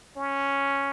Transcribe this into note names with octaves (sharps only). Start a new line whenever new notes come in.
C#4